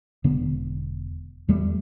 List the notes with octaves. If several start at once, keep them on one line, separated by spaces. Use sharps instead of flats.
E1 D3 B3
E2 E3 G3 A3